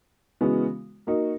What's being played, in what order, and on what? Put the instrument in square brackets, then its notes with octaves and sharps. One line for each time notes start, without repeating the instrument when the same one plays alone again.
[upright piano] C#3 E3 G#3 B3 F#4
A#3 D#4 F#4 A#4